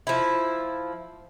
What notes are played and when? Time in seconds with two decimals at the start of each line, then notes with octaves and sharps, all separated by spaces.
0.07 F3 E4